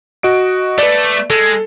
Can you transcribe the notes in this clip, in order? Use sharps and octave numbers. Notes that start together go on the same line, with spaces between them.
F#4 D#5 D7
A3 B4 D5
G#3 A4